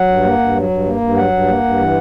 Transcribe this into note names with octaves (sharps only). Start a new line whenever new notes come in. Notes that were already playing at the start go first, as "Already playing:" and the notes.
Already playing: F#3 F#5
G2
A#3
G2
F#3
G2
A#3
G2
F#3 F#5
G2
A#3
G2
E3